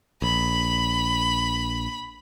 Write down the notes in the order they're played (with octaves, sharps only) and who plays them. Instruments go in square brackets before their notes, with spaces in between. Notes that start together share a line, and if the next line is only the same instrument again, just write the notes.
[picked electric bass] A#1 [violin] B5